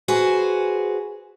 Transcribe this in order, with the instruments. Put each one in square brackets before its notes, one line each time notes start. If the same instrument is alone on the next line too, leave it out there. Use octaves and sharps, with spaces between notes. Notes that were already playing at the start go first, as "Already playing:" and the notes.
[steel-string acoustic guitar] F#4 G#4 B4 C5